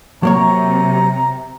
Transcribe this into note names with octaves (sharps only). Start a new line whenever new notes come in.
C3 F#3 A#3 C#5 A#5